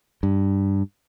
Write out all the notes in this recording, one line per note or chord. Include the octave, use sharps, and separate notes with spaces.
G2